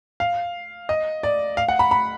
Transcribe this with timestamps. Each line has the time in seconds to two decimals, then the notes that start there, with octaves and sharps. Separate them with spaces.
0.20 F5
0.89 D#5
1.23 D5
1.57 F5
1.68 F#5
1.79 B5
1.91 B5